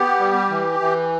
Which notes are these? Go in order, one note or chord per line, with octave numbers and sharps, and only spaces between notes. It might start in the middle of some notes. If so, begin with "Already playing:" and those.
Already playing: B3 G4
G3
E3
E3